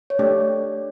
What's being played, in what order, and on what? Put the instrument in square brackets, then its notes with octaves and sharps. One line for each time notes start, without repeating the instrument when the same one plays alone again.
[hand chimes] C#5
[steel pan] A3 D4 G4 [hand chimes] D5